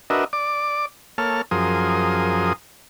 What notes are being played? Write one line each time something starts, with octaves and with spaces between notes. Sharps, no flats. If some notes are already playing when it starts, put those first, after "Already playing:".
D4 F#4 A#4 B4 D#5 E5
D5 D6
A#3 A4 C#5 A5 F6
F#2 F3 G#4 A#4 C6 D#6